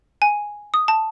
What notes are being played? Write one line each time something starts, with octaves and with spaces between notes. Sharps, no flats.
G#5
D#6
A5